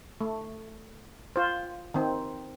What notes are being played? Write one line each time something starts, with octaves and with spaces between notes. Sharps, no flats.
A3
F4 C5
D#3 C4